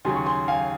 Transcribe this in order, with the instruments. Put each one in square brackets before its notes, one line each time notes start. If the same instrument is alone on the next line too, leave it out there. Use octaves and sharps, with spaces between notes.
[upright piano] D#2 C#3 F#3 [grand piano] G#5 C6
[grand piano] C#6
G#5 C6
F5 G#5